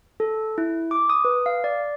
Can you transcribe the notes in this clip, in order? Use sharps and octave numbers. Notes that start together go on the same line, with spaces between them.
A4
E4
D6
D#6
B4
F5
D5